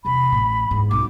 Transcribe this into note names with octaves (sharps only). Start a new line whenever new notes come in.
E2 C3 B5
A1 A2
E2 G#2
B1 F#2 D6